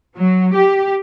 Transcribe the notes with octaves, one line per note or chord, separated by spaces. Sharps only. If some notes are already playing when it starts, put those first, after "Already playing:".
F#3
G4